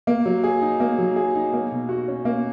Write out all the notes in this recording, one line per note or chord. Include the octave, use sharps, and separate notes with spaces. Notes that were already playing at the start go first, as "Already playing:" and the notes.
A#3
F#3
G#4
D#4
A#3
F#3
G#4
D#4
A#3
B2
F#4
C#4
A#3